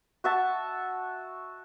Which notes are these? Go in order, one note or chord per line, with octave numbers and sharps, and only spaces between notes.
F#4 E5 A5